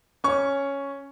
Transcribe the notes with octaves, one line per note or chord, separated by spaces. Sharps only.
C#4 C#6